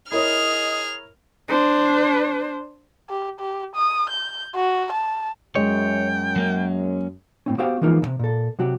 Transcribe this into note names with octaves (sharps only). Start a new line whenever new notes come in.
E4 G#4 A#4 C#5 D#5 F6
D4 C5
G4
G4
D#6
G6
F#4
A5
F#2 G#3 C#5 G5
F#3 A#3 C#4
A2 C4 C#4
B3 F#4 G4 C5 F5 G5
E3 F3 G#3 A#3 D#4 F4
D#2 C3
A#2 A4
C3 F#3 F#4 G4